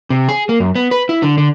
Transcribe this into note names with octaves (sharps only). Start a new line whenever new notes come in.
C3
G#4
A#3
F#2
B3
B4
E4
D3
D3